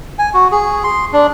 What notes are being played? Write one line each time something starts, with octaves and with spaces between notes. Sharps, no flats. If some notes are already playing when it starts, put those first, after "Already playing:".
G#5
F#4
G#4
C6
D4